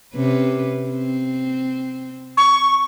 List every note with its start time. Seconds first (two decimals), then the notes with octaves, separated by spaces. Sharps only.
0.14 C3 C#4 B4
0.89 C4
2.37 C#6